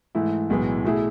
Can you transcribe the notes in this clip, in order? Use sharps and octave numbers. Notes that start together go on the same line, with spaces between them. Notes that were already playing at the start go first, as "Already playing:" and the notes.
G#2 E3 A3 E4
B1 A2 E3 G#3 B3
B2 A3 E4 G#4